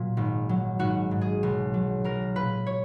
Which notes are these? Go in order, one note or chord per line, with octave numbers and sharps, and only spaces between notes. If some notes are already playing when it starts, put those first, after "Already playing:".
Already playing: A#2 F#3
G#1
F#3
G#1 F#4
G#2
G#4
B1
F#3
B1 A#4
A#2 B4
C#5